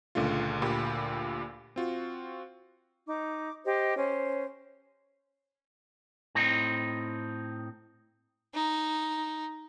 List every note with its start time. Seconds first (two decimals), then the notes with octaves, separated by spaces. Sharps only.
0.15 C#2 A#2 D3 A3 F4
0.62 D2 A#2 G4 B5
1.76 C4 F4 F#4
3.08 D#4 D6
3.65 G4 C5 D#5
3.97 C#4 C5
6.35 A2 C4 D#4
8.54 D#4